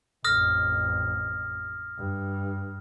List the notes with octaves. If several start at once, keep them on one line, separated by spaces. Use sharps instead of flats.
A1 F2 D#6 F6 A#6
G2